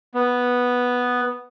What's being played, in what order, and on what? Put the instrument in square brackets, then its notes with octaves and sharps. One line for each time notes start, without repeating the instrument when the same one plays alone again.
[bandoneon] B3